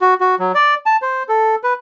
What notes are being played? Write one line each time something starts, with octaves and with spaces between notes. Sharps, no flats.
F#4
F#4
F#3
D5
A5
C5
A4
B4